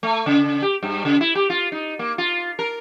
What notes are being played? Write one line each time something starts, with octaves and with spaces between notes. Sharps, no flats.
A3
C#3
G4
G2
C#3
E4
G4
F4
D#4
A#3
F4
A#4